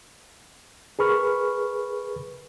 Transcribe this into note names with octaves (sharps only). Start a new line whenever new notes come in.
G#4 A#4 B4 B5 C#6 F6